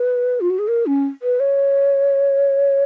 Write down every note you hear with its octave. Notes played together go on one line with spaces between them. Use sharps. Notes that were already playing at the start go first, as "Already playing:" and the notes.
Already playing: B4
F4
F#4
G#4
A#4
C#4
B4
C#5